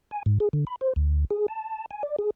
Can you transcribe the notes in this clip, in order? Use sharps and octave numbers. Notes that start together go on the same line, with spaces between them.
G#5
G#2
G#4
D3
B5
C5
D2
G#4
A5
G#5
D5
G#4